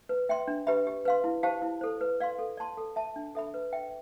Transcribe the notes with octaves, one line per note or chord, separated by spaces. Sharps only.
B4
E5 G5 C6
D4
G4 B4 E5 B5
G4
B4 F5 C6
E4
G4 C5 F5 A5
E4
A4 C5
B4
D5 F5 C6
A4
D5 A5 C6
A4
E5 A5
D4
A4 E5 B5
B4
E5 G5